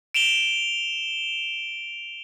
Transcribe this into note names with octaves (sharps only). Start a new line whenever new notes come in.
D7 E7 F7 G7